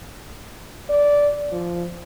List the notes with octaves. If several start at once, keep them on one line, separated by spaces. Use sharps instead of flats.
D5
F3